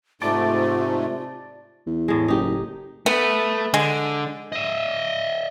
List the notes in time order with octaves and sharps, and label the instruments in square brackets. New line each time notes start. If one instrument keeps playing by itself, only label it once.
[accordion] G#2 A3 [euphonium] C3 [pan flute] F4 [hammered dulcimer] D5 A5 D6
[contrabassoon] E2
[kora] A2 G#3
[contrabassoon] F#1 [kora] D#4 G4
[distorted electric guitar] A3 [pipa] B3
[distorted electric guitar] D3 [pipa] G#3
[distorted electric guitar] D#5 E5